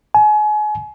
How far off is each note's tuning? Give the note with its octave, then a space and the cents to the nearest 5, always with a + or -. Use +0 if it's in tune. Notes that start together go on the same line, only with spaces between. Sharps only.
G#5 +35